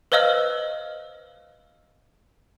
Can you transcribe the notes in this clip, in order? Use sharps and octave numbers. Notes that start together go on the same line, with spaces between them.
B4 C5 D#5 F5 E6 F6